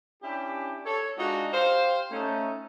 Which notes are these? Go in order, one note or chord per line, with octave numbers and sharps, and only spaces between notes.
C#4 D4 E4 G4
A4 C#5
G#3 D4 D#4 F4 F#4
G4 C5 F5
A3 C#4 D#4